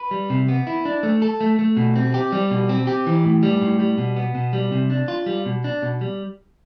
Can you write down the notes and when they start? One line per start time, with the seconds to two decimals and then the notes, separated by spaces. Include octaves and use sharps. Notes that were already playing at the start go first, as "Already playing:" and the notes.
Already playing: B4
0.11 G3
0.30 C3
0.48 B3
0.67 E4
0.85 D4
1.03 A3
1.22 A4
1.41 A3
1.59 A3
1.77 B2
1.96 C4
2.14 G4
2.32 G3
2.51 B2
2.69 C4
2.87 G4
3.06 E3
3.25 A2
3.43 G3
3.62 A2
3.80 G3
3.98 B2
4.16 B3
4.35 B2
4.53 G3
4.72 C3
4.90 D4
5.08 F4
5.26 G3
5.46 B2
5.64 D4
5.82 B2
6.01 G3